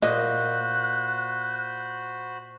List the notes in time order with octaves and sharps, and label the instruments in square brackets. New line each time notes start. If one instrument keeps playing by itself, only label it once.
[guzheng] A#2 [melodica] F#4 C5 B5 [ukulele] D#5 [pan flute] F#6